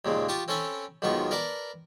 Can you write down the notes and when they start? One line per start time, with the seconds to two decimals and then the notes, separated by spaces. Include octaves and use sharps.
0.05 D#2 A#2 C#3 G#3
0.29 F4 G4 A5 C#6 D#6
0.48 C4 C#4 A4 C#5 G#5 B5
1.02 B1 G#2 D#3 B3 F4 C#6
1.31 A#4 B4 D5 A5 A#5